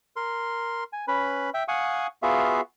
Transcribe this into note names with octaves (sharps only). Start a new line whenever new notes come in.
A#4 C6
G#5
C#4 B4 B5
E5 G5
F5 F#5 G#5 C#6 D#6
B3 F4 F#4 G#4 E5 F5